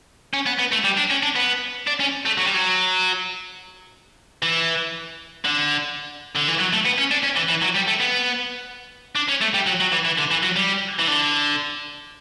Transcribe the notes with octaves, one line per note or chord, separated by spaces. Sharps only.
C#4
B3
B3
A3
G3
D4
C#4
D4
B3
D4
C#4
A3
F#3
G3
F#3
E3
D3
D3
E3
F#3
A3
B3
C#4
D4
C#4
E3
E3
F#3
G3
A3
B3
D4
C#4
A3
G3
F#3
F#3
E3
E3
D3
E3
F#3
G3
E3
D3